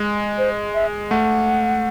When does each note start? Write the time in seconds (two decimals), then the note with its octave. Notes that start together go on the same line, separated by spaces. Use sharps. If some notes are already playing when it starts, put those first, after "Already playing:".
Already playing: G#3
0.38 C5
0.74 E5
1.11 A3 F#5